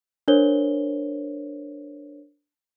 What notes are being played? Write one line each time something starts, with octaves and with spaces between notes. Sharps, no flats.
D4 A#4 C5 C#5 G7